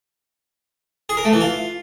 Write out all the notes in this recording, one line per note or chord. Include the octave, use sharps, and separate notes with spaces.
G#4
A#4
A3
E3
F4